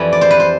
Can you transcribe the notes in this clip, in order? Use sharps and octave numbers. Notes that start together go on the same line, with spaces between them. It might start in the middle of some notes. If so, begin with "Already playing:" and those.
Already playing: F2 E3 G3 B4
D5
C5
B4
C5